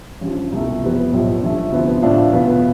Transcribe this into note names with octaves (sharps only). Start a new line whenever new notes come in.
A1 G2 F3
C2 B2 A3 E4
F2 E3 G3 B3
B1 A2 F3
G2 E3 A3
D2 C3 F3 B3 E4
A2 F3 A3 D4 F4
E2 B2 B3 F4 B4